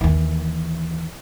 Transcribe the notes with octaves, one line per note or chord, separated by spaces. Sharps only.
D#2 E3